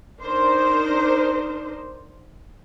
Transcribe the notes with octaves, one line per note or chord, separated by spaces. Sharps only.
D4 D#4 A#4 C5